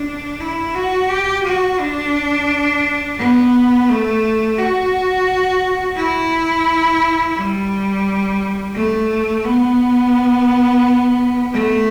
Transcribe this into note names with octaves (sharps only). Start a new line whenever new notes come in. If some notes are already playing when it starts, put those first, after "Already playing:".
Already playing: D4
E4
F#4
G4
F#4
D4
B3
A3
F#4
E4
G3
A3
B3
A3